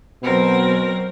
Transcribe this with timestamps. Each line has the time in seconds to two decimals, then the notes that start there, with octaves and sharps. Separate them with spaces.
0.23 B2 F#3 C4 A#4